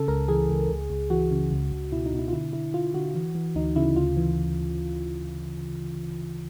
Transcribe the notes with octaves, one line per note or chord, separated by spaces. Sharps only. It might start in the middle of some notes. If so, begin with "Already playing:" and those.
Already playing: C#3 A4
C#2 A#4
E3 G#4
C#2
C#2
C#2
E3 F#4
C#3
C#2
C#2
B2 E4
D#4
B2
E4
F4
D3 E4
D3 E4
D3 F4
D3 F#4
E3
E3
D2 D#4
C#3 E4
D2 F4
E3